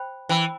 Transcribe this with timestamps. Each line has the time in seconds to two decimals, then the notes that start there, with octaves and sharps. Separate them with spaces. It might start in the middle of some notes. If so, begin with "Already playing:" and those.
Already playing: C5 G5 B5
0.29 E3 C5 G5 B5